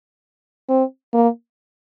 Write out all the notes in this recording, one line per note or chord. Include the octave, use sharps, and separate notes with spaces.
C4
A#3